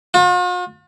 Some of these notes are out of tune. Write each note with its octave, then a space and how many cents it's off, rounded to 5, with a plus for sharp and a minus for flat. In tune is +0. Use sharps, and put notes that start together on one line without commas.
F4 +45